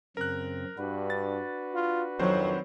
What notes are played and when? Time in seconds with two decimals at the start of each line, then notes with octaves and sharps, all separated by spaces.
0.17 F#2 C#3 C4 A#4 F#6
0.78 G2 D4 F#4 B4
1.10 A6
1.75 F4
2.19 F2 D#3 F#3 C4 C5